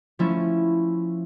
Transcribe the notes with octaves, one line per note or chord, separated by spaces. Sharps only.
F3 A3 C#4 E4